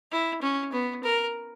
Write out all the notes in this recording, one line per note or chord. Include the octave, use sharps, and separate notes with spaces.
E4
C#4
B3
A#4